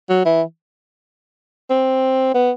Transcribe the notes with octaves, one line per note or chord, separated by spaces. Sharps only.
F#3
E3
C4
B3